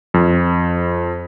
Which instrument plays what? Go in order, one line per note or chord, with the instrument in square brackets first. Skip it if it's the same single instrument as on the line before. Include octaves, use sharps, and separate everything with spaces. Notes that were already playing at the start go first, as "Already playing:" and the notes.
[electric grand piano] F2